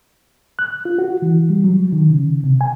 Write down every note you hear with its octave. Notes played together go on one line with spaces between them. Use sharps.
F#6
F4
F#4
E3
G3
F#3
D#3
C#3
C3
G#5